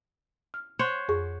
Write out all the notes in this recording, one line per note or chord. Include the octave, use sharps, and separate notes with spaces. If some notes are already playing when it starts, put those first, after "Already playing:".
F6
C5 C#5 F#5
F2 G#4 C#6